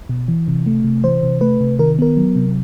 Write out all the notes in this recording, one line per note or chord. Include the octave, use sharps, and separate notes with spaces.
B2
E3
C3
A3
C3
E3 C5
C3
A3 B4
C3
D#3 A#4
B3 A#4
F#3
C3